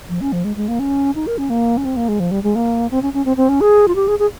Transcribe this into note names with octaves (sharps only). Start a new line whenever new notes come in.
F3
C#4
F3
G#3
G#3
A#3
C#4
D#4
A#4
C#4
A#3
C#4
C4
A#3
G#3
F3
G3
G#3
A#3
C4
C#4
C#4
C4
C4
C#4
G#4
F4
G4
G#4
G#4